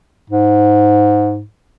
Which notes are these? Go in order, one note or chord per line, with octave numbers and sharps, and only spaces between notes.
G#2